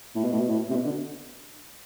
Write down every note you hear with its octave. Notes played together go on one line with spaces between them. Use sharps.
A2
B2
A2
B2
A2
C3
B2
D3